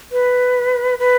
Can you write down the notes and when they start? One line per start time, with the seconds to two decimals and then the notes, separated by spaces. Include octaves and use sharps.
0.12 B4
0.99 B4